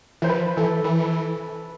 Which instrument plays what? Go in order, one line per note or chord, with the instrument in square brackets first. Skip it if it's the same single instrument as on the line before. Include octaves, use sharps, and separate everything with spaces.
[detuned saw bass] E3 [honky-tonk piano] C5
[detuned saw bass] F3 [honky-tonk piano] B4
[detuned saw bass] E3 [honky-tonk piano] A4
[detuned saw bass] E3 [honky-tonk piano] B4